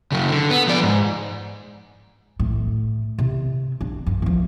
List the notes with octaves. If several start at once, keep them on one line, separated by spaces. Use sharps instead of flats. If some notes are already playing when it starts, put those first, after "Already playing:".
C#3 F#3
D3
B3
F3 D5
G#2
A2
C3 E4
D4
G2
E2 F3